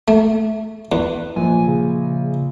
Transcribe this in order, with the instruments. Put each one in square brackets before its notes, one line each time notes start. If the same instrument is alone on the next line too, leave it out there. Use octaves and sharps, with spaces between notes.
[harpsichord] A3
[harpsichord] E2 [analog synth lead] B4
[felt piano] A#1 [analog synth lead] G#5
[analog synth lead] C#3